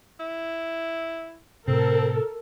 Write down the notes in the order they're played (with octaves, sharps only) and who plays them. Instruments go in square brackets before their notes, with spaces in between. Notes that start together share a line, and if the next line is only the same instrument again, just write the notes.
[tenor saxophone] E4
[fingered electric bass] A2 C3 [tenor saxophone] C4 [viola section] A4 A#4